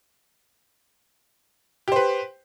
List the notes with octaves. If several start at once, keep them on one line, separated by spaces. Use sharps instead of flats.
G4 B4 C5